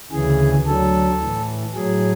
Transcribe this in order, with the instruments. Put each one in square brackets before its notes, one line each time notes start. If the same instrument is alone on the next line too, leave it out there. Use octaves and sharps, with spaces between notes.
[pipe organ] D2 C#3 E3 G#4
D2 D3 F#3 A4
A2 E3
A2 F#3 G#4